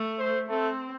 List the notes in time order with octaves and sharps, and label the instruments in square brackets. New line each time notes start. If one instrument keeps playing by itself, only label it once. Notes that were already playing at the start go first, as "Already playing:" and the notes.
Already playing: [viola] A3
[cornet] C5
[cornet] A3 [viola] C4